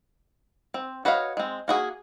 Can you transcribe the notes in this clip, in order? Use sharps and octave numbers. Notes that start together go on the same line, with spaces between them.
C4
F#4 B4 C#5 D#5 F5
G#3 C4
A#3 F#4 G#4